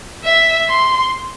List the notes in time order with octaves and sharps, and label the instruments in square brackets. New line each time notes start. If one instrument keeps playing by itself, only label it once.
[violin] E5
C6